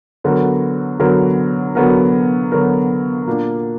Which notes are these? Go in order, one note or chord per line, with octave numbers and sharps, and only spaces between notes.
D3 F#3 B3 F#4 A#4
D3 F#3 B3 F#4 A#4
D3 F#3 B3 F#4 A#4
D3 F#3 B3 F#4 A#4
A#2 A#3 D4